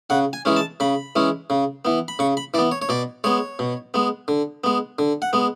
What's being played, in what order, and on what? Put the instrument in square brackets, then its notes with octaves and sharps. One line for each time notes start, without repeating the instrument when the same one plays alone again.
[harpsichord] C#3 F#5
G#5
E3 G#3 C#4
A5
C#3 B5
E3 G#3 C#4
C#3
E3 B3
B5
C#3 C#6
B5
E3 D5
B3
C#5
C#5
B2 D5
G#3 B3 C#5
B2
G#3 B3
D3
G#3 B3
D3
F#5
G#3 B3